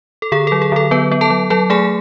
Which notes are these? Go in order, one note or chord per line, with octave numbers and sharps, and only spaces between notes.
A4
D3 G#4
A4
F#3
G#4
D3 A4
F#3 B3 B4
B3
A4 A5
F#3
F#3 A4 A5
A3 G#4 G#5